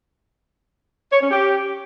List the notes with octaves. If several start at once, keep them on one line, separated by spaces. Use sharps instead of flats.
C#5
C#4
G4